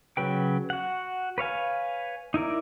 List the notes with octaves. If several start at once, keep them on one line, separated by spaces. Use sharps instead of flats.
C#3 F#3 B4 G5
F#4 F#5
B4 C#5 F5 G#5
D#4 E4 A#4 D5